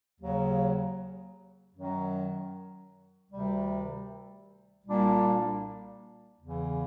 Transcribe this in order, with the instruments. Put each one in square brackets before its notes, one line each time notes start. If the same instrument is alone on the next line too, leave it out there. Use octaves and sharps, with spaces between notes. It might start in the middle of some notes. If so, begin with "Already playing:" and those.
[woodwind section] D#2 C#3 F#3
F#2 D#3 F#3
D2 C3 D#3 G3
C2 A#2 G3 A#3 D4
E2 C#3 E3